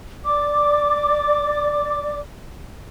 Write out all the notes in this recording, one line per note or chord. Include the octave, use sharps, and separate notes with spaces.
D5 D6